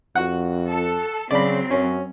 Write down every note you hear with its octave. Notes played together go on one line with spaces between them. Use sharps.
F2 F#4 F#5
A4
C#3 F#3 C4 D5 B5
F#2 C#4